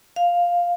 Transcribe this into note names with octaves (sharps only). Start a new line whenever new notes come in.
F5